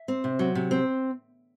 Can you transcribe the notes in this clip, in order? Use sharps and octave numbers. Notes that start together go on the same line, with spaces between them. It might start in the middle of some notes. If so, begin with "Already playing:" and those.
Already playing: E5
C4
C3
F#3
C3
C4